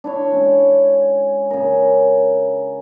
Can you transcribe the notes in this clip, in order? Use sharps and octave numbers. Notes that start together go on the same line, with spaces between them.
D4 E4 C#5
G#3 C#4
C#3 A#4